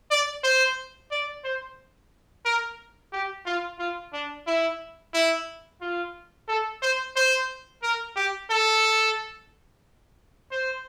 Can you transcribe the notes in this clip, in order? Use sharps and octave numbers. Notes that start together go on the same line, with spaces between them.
D5
C5
D5
C5
A#4
G4
F4
F4
D4
E4
E4
F4
A4
C5
C5
A#4
G4
A4
C5